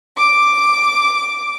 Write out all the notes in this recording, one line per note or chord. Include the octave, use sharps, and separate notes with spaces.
D6